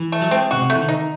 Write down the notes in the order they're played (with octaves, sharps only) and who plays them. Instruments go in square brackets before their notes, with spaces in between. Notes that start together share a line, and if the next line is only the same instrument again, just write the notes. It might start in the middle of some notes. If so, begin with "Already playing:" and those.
Already playing: [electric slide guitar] E3
[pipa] A3
[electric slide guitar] F#3
[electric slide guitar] G#3 [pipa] C4
[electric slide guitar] C#3 [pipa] F#4
[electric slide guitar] C3
[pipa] A3
[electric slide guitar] E3
D#3
[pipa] D#4